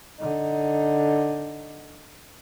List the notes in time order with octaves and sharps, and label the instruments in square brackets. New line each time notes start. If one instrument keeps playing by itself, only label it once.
[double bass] D3 D#4